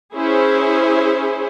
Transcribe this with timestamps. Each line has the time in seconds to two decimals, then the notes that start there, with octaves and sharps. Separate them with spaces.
0.15 C#4 E4 G#4 C5